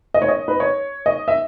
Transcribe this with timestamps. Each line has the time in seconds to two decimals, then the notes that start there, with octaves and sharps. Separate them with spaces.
0.14 D#5
0.22 C#5
0.29 D#5
0.48 B4
0.60 C#5
1.06 D#5
1.28 E5